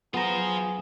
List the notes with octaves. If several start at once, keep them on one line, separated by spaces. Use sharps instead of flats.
F#3 B3 F4 G#4 C5 A#5